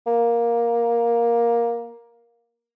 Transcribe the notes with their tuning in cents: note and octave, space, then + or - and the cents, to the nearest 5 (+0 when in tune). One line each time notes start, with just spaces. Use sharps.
A#3 +10